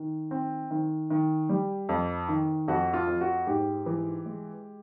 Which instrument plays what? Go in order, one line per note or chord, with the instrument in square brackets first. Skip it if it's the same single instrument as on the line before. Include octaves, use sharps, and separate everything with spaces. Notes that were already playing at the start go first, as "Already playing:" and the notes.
Already playing: [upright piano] D#3
C4
D#3
D#3
G3
F2
D#3
F2 F#4
F4
F2
F#4
G#2 G4
E3
G#3